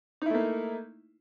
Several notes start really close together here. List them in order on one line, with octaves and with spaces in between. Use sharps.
D#4 E4 A3 A#3